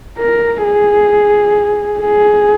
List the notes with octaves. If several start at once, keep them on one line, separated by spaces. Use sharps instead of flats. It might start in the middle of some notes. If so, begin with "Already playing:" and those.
A#4
G#4
G#4